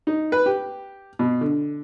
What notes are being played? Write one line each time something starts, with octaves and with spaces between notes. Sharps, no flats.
D#4
B4
G4
B2
D3